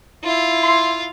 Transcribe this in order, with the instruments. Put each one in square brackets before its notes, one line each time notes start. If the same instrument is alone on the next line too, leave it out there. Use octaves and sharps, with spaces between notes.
[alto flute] E4 [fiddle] F4 F5
[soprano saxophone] C6